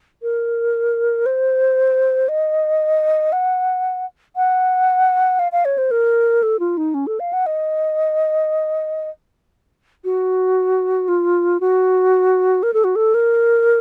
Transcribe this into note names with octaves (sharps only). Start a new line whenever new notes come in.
A#4
C5
D#5
F#5
F#5
F5
F5
C#5
C5
A#4
A4
F4
D#4
C#4
A4
F5
F#5
D#5
F#4
F4
F#4
A#4
A4
F#4
A4
A#4